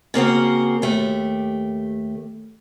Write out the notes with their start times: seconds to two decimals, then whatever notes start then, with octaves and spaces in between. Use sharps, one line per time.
0.14 C#3 A#3 C4 F#4
0.82 D#2 A3 G4